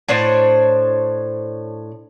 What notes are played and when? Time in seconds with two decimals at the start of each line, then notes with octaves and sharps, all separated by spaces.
0.09 A2 D4 C5 C#5